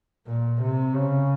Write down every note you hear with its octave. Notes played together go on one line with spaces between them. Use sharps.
A#2
C3
C#3